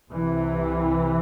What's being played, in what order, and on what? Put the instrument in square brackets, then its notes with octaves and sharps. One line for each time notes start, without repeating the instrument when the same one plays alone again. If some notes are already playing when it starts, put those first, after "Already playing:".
[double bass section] C2 C3 E3